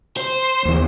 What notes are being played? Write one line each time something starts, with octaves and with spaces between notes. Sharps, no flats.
C5
D#2 E3